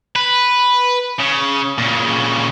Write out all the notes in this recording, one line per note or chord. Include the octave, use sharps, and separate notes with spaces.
B4
C#3
A#2 C#3